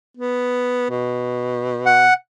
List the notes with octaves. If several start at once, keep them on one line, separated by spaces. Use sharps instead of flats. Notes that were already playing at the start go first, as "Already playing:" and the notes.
B3
B2
F#5